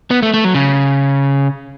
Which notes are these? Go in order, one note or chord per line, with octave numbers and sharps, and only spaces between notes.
B3
A3
A3
F#3
C#3